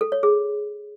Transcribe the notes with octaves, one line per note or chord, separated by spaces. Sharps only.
A4
C#5
G#4